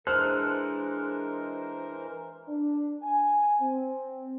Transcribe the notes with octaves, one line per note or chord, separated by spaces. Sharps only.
E3 G#3 D4 A4 A#4 C5 F6 F#6
D4
G#5
C4